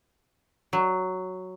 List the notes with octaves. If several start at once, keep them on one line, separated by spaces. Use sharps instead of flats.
F#3